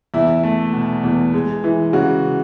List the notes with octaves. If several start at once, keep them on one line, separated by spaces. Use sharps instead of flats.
E2 E4
A3
B2
E2
G#3
E3
C#3 F#4